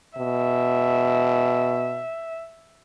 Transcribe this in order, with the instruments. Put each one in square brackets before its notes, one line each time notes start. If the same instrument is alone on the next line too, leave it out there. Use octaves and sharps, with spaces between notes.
[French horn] B2 [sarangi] E5